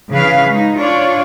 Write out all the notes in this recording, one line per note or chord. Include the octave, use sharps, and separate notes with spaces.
C#3 E3 C#4 B4 F5
G#3 D#4
D4 F4 C#5 D5